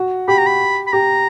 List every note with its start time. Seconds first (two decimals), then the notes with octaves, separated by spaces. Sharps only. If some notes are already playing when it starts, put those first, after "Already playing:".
Already playing: F#4
0.28 G4 B5
0.38 A#5
0.46 B5
0.87 B5
0.92 G4 A#5